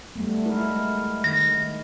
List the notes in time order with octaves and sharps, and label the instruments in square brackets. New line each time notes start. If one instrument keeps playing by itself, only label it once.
[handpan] G3 A3 B3
G#3 E4 A#4
[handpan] D#3 [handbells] A#6